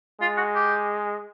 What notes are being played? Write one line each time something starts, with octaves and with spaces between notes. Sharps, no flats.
G#3 F4
F#4
G4